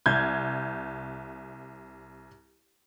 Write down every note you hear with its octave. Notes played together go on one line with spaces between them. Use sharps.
C2 G6 G#6